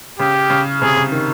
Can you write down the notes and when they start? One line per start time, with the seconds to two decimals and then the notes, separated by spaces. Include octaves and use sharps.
0.19 C#3 G4
0.50 C#3
0.82 C3 G#4
0.97 C#3
1.12 D#3